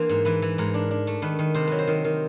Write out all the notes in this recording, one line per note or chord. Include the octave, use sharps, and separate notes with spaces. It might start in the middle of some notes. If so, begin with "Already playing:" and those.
Already playing: E3 A#3 D4 C5
G#2
E3 B4
E3
G#2 A#4
D4
D4
A3
D#3 B4
D#3
C3 C5
F#3 B4
C5
D#3
D#3